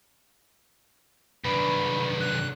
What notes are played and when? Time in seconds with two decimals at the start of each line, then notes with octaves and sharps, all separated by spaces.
1.45 C2 F#2 D#3 D4 B4 B5
2.20 F#6